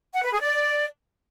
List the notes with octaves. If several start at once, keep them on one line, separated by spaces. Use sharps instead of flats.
F#5
B4
G#4
D5